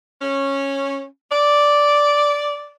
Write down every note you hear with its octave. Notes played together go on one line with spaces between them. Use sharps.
C#4
D5